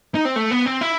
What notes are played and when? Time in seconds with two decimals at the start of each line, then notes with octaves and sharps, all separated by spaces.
0.15 D#4
0.25 C4
0.36 A3
0.51 B3
0.66 C4
0.81 E4